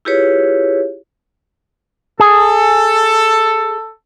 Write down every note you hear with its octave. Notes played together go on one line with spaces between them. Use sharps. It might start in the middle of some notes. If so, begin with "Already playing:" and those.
E4 F4 G4 G#4 B4 C#5
G#4 A4